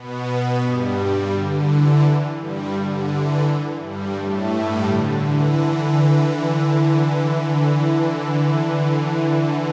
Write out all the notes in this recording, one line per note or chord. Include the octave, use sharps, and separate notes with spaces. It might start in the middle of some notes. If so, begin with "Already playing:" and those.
Already playing: B2 B3
G2 G3
D3
E3
G2 G3
D3
E3
G2 G3
A2 A3
G2 G3
D3
E3